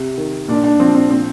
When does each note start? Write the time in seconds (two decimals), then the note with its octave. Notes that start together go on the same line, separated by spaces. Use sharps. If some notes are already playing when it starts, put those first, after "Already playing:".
Already playing: C3
0.18 D#3
0.48 A#2 D4
0.64 D4
0.80 F3 C4
0.95 C4
1.10 A#2 C4